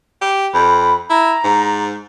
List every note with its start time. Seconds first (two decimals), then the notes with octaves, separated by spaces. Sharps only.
0.22 G4
0.54 F2 B5
1.10 E4 A#5
1.44 G#2